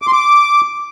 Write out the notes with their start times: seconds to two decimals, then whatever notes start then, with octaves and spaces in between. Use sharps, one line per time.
0.02 D6
0.07 C6
0.13 D6